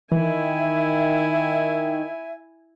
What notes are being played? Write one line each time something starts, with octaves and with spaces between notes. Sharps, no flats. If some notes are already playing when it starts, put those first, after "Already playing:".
D#3 E3 E4 E5 G#5